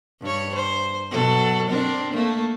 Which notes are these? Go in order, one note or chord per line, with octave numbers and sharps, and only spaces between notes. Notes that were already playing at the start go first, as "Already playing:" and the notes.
G2 C#5
C5
B2 F#3 A4
C4 D4 A#4
A3 A#3